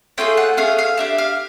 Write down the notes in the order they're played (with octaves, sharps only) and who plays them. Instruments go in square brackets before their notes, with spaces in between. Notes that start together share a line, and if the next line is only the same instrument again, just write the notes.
[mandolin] A3 C#4 F4 G#4 G5
F#5
A3 C#4 G#4 F5
F5
D4 G4 E5
F5